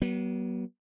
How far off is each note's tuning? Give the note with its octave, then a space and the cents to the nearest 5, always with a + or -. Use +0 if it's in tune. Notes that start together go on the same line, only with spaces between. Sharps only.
F#3 +35 B3 -40